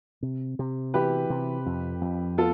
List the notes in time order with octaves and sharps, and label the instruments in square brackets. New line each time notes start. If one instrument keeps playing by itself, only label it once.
[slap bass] C3
C3
[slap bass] E3 [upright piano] G4 B4
[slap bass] C3
F2
F2
[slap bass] B3 [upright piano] F4 A4